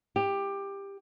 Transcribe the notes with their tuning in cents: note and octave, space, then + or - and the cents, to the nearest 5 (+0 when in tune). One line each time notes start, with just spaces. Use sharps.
G4 +15